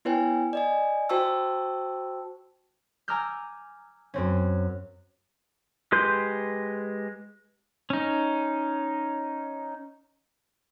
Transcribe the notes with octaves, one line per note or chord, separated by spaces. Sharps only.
B3 E4 B4 C#5 G5 G#5
D5 D#5 G#5
F#4 C5 G5 A5 C#6 E6
G#5 A#5 D6 E6 F6 G6
F#2 C4 C#4
G#3 G4 B4 C6 G6
C#4 D#4